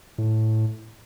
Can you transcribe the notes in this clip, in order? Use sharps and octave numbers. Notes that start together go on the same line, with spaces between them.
A2